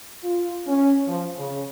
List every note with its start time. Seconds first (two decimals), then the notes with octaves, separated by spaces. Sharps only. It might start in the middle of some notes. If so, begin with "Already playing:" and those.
0.23 F4
0.67 C#4
1.08 F3
1.38 C#3